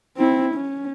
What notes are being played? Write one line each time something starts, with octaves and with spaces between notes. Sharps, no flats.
C4 E4
C#4